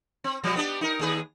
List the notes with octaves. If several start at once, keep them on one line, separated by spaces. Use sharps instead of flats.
C4
B2 F3 G3
B3 D4 G4
D#4 A#4
D#2 G#4 B4